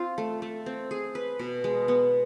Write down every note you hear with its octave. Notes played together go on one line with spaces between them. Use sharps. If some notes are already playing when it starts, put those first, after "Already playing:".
Already playing: C4 F4
A3
A3
C4
G#4
B4
B2
G#3
B3